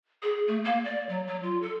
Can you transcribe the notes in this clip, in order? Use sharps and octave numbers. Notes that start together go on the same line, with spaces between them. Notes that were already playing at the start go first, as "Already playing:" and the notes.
G#4
A3
A#3
D5
F#3
F#3
F4
A4